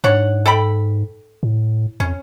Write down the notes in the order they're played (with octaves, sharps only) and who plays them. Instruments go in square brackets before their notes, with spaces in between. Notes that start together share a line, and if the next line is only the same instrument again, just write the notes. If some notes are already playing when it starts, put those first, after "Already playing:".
[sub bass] G#2 [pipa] D4 C#5 F#5
[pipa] A4 G5 B5
[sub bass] A2
[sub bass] F2 [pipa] C#4